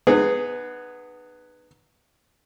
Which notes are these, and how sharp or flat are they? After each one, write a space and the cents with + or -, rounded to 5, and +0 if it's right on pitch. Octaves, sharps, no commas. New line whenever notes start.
B3 +0 D#4 -45 G#4 +0